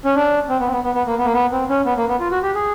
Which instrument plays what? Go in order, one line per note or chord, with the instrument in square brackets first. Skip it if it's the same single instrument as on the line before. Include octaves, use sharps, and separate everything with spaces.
[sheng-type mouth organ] C#4
D4
C4
B3
C4
B3
B3
B3
A#3
B3
A#3
B3
C4
C#4
B3
A#3
B3
F4
F#4
G4
G#4